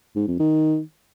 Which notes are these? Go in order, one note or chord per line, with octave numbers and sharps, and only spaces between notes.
G#2
F2
D#3